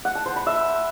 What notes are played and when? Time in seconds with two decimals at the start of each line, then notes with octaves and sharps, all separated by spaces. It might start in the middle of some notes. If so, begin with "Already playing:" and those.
0.05 F#5
0.15 A5
0.26 C5
0.36 B5
0.47 E5